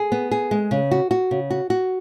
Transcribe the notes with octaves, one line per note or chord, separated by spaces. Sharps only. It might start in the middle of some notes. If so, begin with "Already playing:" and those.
Already playing: G#4
B3
G#4
G#3
C#3
F#4
F#4
C#3
F#4
F#4